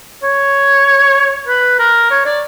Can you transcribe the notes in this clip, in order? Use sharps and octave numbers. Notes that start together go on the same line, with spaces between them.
C#5
B4
A#4
C#5
D5